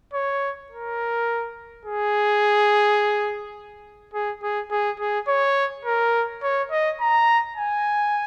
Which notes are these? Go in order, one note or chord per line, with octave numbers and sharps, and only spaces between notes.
C#5
A#4
G#4
G#4
G#4
G#4
G#4
C#5
A#4
C#5
D#5
A#5
G#5